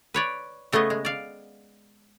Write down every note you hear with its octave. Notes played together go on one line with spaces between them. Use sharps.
B4 C#5 D5
C#3 A3 B3 G#4 D#5
G#3
D5 F5